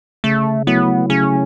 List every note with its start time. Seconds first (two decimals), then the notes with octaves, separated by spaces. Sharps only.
0.24 C#3 A3
0.67 F#3 A3 B3 E4
1.10 C#3 C#4